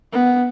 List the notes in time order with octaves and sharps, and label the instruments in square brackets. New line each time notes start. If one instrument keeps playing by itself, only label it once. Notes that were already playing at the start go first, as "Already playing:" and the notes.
[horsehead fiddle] B3